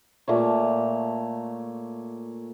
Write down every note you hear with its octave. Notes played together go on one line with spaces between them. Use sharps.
A#2 A3 C#5